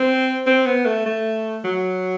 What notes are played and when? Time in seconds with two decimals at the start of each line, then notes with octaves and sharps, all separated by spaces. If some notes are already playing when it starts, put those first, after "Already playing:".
Already playing: C4
0.46 C4
0.66 B3
0.86 A3
1.06 A3
1.64 F#3